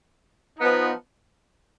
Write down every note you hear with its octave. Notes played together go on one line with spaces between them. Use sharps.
F3 B3 D#4